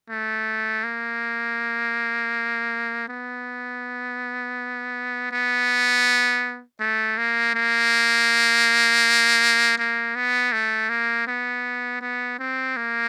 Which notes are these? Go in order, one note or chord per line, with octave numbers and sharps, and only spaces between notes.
A3
A#3
B3
B3
A3
A#3
A#3
A#3
B3
A3
A#3
B3
B3
C4
A#3